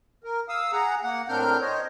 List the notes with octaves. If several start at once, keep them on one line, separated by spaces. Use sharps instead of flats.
A#4
F5 D#6 E6
G#4 F#5 A#5
A#3 F#5
A2 C4 D4 A#4 F6 G6
C5 C#5 D#5